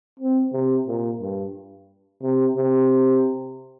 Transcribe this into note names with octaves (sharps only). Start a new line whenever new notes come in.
C4
C3
A#2
G2
C3
C3